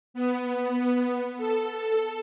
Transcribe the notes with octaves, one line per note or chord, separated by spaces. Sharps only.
B3
A4